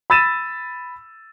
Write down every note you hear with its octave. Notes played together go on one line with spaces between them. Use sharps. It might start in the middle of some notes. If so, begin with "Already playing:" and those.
B5 E6 A6 D#7 E7